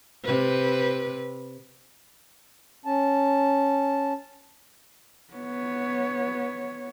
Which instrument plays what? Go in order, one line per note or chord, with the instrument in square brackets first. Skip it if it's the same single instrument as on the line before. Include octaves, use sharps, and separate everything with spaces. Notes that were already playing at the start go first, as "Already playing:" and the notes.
[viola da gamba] C3 B4
[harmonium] C#4 A5
[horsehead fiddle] B3 C#5